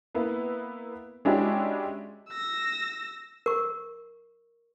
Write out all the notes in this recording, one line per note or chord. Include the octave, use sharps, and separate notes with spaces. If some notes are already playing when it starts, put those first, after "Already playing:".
A#3 B3 E4
G#3 C#4 D4 E4 F#4 G4
E6 A#6
A#4 C#6